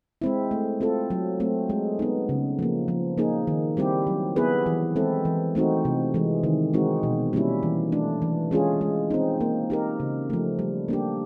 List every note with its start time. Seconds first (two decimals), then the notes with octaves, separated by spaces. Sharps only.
0.22 G#3 C4 E4
0.51 A3
0.81 C4 F4 A4
1.10 F#3
1.40 A3 C4
1.70 G#3
1.99 B3 D#4
2.29 C#3
2.59 F3 A#3
2.88 F3
3.18 A#3 D#4 G#4
3.47 D#3
3.77 G3 C4 E4 G4
4.07 F#3
4.36 B3 E4 G#4 B4
4.66 E3
4.96 G#3 C4 E4 A4
5.25 E3
5.55 A3 C4 D#4 F#4
5.85 C3
6.14 E3 G#3
6.44 D#3
6.74 G#3 C4 D#4 F#4
7.03 B2
7.33 G3 A#3 C#4 E4
7.63 E3
7.92 A3 D4
8.22 E3
8.51 G#3 C#4 F4 G#4
8.81 G#3
9.10 C4 D#4
9.41 A#3
9.70 D#4 G4 A#4
10.00 C#3
10.30 F3 A3
10.59 G3
10.88 A#3 D4 G4